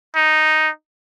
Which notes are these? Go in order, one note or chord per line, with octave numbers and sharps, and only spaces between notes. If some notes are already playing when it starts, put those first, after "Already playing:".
D#4